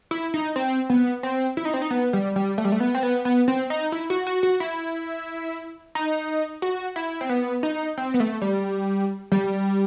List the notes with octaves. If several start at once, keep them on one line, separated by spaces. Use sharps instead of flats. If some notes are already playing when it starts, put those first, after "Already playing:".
E4
D#4
C4
B3
C4
E4
D#4
C4
D#4
B3
G3
G3
A3
G3
A3
B3
C4
B3
B3
C4
D#4
E4
F#4
F#4
F#4
E4
D#4
F#4
E4
C4
B3
D#4
C4
B3
A3
G3
G3